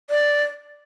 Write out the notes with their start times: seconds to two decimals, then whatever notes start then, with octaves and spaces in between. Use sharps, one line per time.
0.10 D5